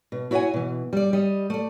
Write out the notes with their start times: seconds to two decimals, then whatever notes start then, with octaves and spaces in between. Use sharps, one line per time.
0.12 B2
0.31 E4 F#4 C#5 D#5 F#5 G#5
0.54 B2 E3
0.93 G3 D5
1.13 G3 D#5
1.50 A3 D5